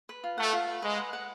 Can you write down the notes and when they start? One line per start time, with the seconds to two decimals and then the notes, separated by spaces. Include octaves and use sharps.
0.09 B4
0.24 F4
0.38 A3 F#5
0.53 F4
0.68 B4
0.82 G#3 B4
0.97 F#5
1.13 F#5